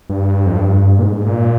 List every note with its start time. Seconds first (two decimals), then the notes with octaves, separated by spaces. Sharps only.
0.09 G2
0.46 F2
0.56 G2
0.99 A#2
1.03 G#2
1.26 A#2